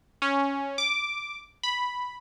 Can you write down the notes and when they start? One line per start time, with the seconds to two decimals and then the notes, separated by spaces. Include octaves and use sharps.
0.22 C#4
0.78 D6
1.63 B5